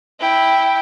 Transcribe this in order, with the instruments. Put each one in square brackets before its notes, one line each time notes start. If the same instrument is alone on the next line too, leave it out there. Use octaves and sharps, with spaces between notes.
[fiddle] E4 G5